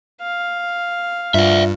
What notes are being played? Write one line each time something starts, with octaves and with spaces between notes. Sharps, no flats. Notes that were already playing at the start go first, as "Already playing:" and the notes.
F5
G2 F4 D5 E5